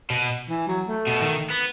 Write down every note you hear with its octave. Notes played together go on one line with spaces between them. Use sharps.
B2
E3
F#3
A3
B2
D#3
B3